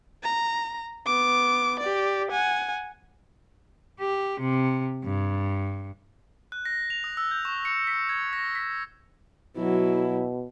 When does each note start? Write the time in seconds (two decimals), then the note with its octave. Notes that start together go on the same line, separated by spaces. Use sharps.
0.23 A#5
1.06 B3 D6
1.80 G4 D5
2.31 F#5 G#5
4.01 G4
4.41 C3
5.04 G2
6.52 F#6
6.65 A#6
6.90 F7
7.04 D#6
7.17 E6
7.31 G6
7.45 C#6
7.65 C#7
7.87 B6
8.09 G#6
8.33 A#6
8.55 B6
9.57 B2 F#3 E4